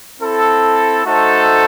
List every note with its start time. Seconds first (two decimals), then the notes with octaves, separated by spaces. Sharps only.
0.19 C4 E4 A4
1.05 A3 D#4 F#4 A4 C5